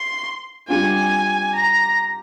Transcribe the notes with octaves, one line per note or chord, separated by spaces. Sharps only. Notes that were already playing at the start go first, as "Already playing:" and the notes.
Already playing: C6
G3 D4 F4 G#5
A#5